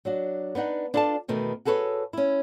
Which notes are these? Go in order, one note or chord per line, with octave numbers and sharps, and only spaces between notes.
F#3 D4 F#4
B3 D4 D#4 F#5
D4 E4 F4 A4 D5 A5
E2 B2 D#3 A3 D#4
F#4 G#4 A4 B4 C#5
C#4 E4